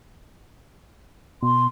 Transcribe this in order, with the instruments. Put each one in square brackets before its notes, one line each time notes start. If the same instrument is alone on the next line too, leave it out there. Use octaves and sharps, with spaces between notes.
[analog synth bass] B2 [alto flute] C6